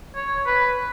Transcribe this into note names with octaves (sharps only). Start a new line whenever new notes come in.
C#5
B4